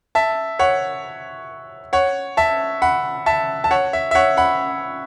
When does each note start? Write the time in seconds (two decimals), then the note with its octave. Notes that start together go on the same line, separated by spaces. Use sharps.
0.15 E5 A5
0.59 C#5 F#5
1.93 C#5 F#5
2.37 E5 A5
2.82 F#5 B5
3.26 E5 A5
3.64 A5
3.71 C#5 F#5
3.93 E5
4.11 E5
4.15 C#5 F#5
4.37 F#5 B5